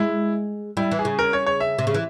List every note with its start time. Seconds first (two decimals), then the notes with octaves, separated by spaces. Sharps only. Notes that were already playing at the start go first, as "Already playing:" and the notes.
Already playing: G#3 E4
0.77 G3 E4
0.91 E3
0.99 G#4
1.05 C#3
1.19 A#4
1.33 C#5
1.46 C#5
1.60 E5
1.79 C3
1.87 C#3
1.94 E3